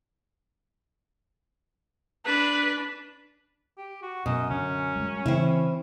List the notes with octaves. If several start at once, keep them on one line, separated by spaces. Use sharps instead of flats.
D4 B4
G4
F#4
F#2 B2 D#5
D3 C#4
G3 G#3
C#3 E3 C4 E4